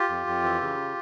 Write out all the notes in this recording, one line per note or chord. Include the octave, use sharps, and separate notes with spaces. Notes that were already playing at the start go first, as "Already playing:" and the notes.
Already playing: F4 G4
F2
F2
E3
C#3